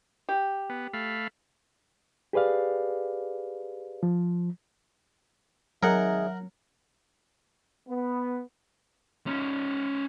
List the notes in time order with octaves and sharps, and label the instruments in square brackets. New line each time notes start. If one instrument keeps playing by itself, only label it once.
[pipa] G4
[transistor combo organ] B3
A3 F5 B5
[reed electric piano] G4 G#4 B4 D5 F5
F3
[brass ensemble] G#1 E5 [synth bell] F#3 [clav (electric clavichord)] D#4 G#4 [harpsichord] A#4 F#5
[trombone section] B3
[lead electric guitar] C#4 D#4